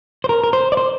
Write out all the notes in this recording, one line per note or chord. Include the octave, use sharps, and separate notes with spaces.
C5
A#4
A#4
C5
D5
C5